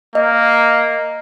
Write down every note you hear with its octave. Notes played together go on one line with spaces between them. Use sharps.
A#3 D#5